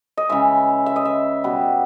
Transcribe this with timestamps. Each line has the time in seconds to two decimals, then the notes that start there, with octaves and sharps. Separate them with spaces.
0.17 D#5
0.29 C#3 E3 G#3 E5
0.86 E5
0.96 D#5
1.05 E5
1.44 B2 G3 B3